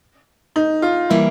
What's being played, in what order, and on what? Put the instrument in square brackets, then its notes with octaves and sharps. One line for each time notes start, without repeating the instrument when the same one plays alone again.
[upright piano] D#4
F4
[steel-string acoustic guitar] E3 G3 A#3 [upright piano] E4